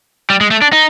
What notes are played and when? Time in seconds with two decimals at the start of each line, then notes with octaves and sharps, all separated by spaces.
0.30 G3
0.41 G#3
0.51 A3
0.62 D4
0.73 D#4